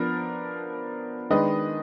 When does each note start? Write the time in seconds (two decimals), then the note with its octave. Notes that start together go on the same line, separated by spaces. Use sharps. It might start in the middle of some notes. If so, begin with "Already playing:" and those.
Already playing: F3 B3 D4 A#4
1.30 D#3 G#3 D4 B4 D#5